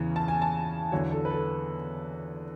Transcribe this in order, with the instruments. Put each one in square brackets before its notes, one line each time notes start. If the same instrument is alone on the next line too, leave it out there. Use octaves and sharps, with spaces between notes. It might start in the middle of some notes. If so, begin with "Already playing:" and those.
Already playing: [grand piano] E2 C#3 E3
A5
G#5
A5
E2 D3 F#3 C#5
A4
B4
A4